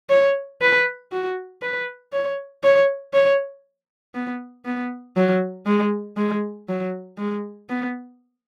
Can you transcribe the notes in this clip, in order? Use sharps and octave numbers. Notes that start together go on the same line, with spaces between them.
C#5
B4
F#4
B4
C#5
C#5
C#5
B3
B3
F#3
G#3
G#3
F#3
G#3
B3